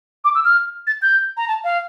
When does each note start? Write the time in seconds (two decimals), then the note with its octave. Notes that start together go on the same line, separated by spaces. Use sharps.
0.24 D6
0.35 E6
0.45 F6
0.87 A6
1.02 G6
1.37 A#5
1.48 A5
1.64 F5